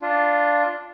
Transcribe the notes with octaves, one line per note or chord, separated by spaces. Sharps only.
D4 F4